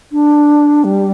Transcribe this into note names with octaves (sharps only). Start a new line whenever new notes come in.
D4
G3